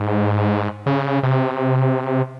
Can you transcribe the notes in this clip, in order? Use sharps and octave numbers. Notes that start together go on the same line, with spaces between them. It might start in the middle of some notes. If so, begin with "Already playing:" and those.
Already playing: G#2
C#3
C3